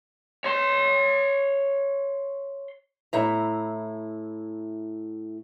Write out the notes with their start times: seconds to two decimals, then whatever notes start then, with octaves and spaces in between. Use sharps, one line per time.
0.44 C#5 C6
3.13 A2 E4 A#5